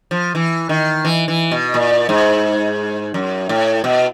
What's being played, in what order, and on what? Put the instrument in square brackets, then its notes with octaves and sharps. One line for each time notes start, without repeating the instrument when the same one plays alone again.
[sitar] F3
E3
D#3
E3
E3
B2
A#2
G#2
F#2
A2
B2